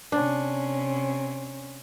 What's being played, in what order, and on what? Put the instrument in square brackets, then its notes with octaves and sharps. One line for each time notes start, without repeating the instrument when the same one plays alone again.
[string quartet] C3 C#4 [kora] D4